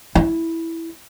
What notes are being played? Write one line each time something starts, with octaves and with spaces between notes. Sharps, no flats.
E4